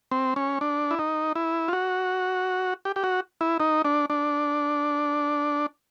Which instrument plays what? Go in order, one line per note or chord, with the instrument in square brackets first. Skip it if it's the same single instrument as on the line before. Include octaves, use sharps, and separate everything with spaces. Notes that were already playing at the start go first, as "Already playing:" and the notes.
[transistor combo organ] C4
C#4
D4
E4
D#4
E4
F4
F#4
G4
G4
F#4
E4
D#4
D4
D4